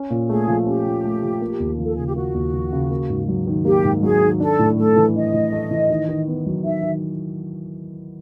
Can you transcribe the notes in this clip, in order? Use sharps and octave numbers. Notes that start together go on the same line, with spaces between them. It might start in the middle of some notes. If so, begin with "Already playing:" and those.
Already playing: C#4
A#2
A3 G#4
F3
C#4 G4
A#2
A3
F3
A#3
D#2
F3
A4
C#3 G#4
G4
A#3 F#4
D#2
F3
C#3
A#3
G#2
F#3
D#3
A#3 G4
G#2
F#3 G#4
D#3
D4 A4
A2
A3 A4
E3
D4 D#5
A2
A3
E3
D#3
D#3
B3
F#3
D#3 E5
D#3